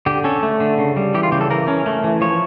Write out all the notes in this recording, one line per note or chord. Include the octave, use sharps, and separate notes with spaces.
D3 G4
C#4 A4
A3
D3
C#3
G3
E3 G4
F4
C#3 G4
A4
E3 A#4
C#4
A3
E3
F3 C#5